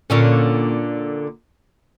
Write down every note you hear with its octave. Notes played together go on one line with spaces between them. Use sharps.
A#2 D3 C#4